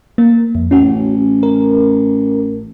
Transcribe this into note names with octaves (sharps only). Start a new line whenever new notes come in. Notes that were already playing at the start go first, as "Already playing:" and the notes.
A#3 A#4
F2
A1 C#4 F#4
A#4